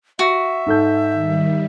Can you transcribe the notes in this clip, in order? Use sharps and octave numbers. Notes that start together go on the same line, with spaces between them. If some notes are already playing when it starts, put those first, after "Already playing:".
F#4 E5
G#2 A4 G6
D#3 G3